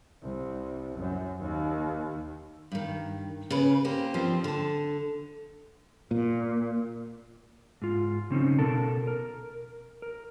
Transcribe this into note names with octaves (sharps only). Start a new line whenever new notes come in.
C2
F#2
D#2
G2 D#3
C#3 B4
A#3 C4 G4
G2 F3 G3 C4
D3 A5
A#2
G#2 F4
C#3 C4 C#4 D#4
B2 A4 A#4 A5
A#4
A#4